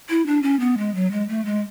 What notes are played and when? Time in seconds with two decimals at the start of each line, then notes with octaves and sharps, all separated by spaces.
0.09 E4
0.26 D4
0.43 C#4
0.60 B3
0.78 G#3
0.95 F#3
1.12 G#3
1.29 A3
1.45 G#3